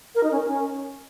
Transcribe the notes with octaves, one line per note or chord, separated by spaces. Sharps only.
A#4
D#4
C#4
A#4
C#4